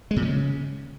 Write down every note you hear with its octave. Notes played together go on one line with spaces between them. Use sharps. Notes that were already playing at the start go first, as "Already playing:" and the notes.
G#3
A#2
C#3